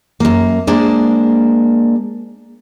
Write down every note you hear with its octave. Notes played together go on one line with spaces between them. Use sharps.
F#2 A#3
G#3 A#3 D4 C5